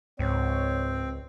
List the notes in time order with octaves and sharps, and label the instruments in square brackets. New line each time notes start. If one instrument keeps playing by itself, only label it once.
[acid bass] C#2 [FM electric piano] G#2 [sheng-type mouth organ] C4 [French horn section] C#5